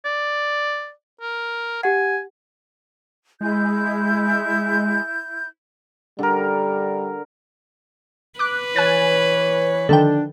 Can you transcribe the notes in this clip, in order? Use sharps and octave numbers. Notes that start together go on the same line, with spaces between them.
D5
A#4
G4 F#5 G#5
G#3 E4 G6
D3 G3 A#4
B4 D6 F#6
E3 C#5 G#5 F#6 A6
D3 D#3 F3 D4 A4 G5